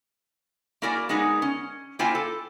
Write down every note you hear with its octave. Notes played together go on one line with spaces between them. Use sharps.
A#3 E4 F#4 A#4 D5 G#5
G#3 B3 D#4 G#4 A#4
C#4
A#3 E4 F4 C5 G5 G#5
A4